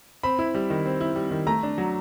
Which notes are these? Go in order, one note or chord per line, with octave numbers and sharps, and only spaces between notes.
C4 B5
E4
G3
D#3
C4
E4
G3
D#3
A3 A#5
D4
F#3